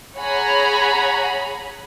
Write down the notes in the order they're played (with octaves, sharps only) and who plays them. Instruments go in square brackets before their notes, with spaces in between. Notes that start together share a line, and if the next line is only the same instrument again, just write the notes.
[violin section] G#4 C#5 F#5 G#5 A#5 B5